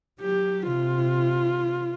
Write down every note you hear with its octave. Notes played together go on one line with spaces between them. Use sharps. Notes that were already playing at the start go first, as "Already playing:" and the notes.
F#3 G4
C3 F4